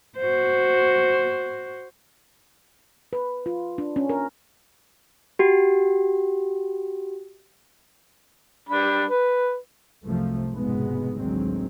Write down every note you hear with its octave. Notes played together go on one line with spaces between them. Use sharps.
F#4 C5
B4
F4
D4
C#4
A#4
F#4 G4
G3 D4 B5
B4
C2 F#2 C3 F3 A3
F1 G#2 B2 G#3 B3
A1 D2 D#3 F#3 G#3 C4